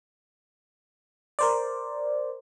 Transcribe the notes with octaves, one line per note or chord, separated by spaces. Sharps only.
A#4 C5 D5